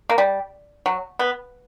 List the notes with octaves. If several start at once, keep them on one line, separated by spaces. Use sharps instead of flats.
A#3
G3
F#3
B3